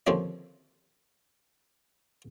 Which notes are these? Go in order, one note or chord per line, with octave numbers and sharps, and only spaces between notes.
D#2 D3 F3 C4 C#4 D#5